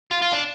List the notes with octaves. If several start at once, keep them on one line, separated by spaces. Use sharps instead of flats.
F4
F4
D4